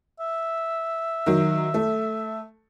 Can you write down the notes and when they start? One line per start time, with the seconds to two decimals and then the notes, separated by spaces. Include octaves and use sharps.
0.19 E5
1.26 D#3 F#3
1.74 A3